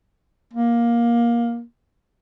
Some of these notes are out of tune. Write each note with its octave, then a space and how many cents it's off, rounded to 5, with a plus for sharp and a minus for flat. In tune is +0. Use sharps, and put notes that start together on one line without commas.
A#3 +15